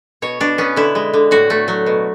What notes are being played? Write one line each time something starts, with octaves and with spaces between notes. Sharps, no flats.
B2 C#5
B2 D4
B3 C#4
D3 E4
G#3
D3
A2 F#4
A3
F#3
B2